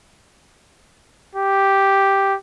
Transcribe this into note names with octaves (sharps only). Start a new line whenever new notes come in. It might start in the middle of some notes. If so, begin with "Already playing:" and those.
G4